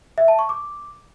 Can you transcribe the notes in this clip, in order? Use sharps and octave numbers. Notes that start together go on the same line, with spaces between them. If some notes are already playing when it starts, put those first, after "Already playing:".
E5
A5
C#6
D6